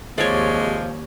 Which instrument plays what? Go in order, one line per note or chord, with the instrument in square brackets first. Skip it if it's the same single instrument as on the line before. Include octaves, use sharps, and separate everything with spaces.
[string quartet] D#2 [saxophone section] C3 F3 G#3 [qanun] C#5 D5